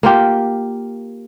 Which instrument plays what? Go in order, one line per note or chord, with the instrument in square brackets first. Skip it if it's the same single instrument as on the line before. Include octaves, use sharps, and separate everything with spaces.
[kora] A#3 F4 G4